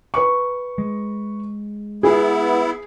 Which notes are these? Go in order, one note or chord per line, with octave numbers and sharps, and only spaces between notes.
B4 C#6
G#3
B3 E4 G#4